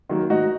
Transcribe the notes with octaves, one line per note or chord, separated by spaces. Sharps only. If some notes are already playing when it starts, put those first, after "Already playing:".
D#3 F#3 A#3
G#2 D#4 F#4